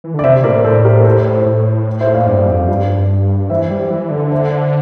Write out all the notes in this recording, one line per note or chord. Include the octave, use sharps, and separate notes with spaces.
E3
D3
D5
C3 C5 E5
A2 A#4 D5
A2 A4 C5
G4 A#4
A4 C5
A2
C5 E5
D5 F5
G2 D5 F5
F2 D5 F5
G2
E3 C5 E5
G3
E3
D3
C5 E5